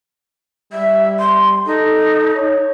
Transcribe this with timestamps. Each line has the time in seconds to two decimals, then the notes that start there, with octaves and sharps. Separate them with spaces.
0.72 G3 E5
1.19 C6
1.66 D#4 A4
2.35 C#5